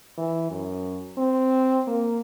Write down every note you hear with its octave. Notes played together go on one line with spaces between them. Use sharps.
E3
F#2
C4
A#3